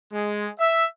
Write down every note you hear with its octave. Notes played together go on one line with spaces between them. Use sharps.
G#3
E5